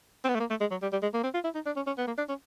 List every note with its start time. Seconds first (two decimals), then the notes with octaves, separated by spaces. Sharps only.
0.24 C4
0.29 B3
0.35 A3
0.40 A#3
0.50 A3
0.60 G#3
0.71 F#3
0.82 G3
0.92 G3
1.02 G#3
1.14 A#3
1.23 C4
1.34 F4
1.44 E4
1.55 D#4
1.66 D4
1.76 C#4
1.87 C#4
1.98 B3
2.07 A#3
2.18 D4
2.29 C#4